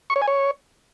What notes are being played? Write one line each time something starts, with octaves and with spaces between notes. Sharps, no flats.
C#6
C#5
G#5
C#5